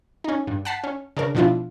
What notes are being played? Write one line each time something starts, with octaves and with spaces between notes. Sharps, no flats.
C#4 D#4
G2
F#5 G5 A5 B6 C7
C#4
C#3 D4 A#4
B2 F3 D4 E4 F4